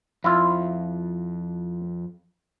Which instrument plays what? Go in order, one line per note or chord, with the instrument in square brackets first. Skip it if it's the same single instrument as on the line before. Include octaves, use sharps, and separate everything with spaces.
[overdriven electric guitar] F2 [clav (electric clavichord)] E4 F4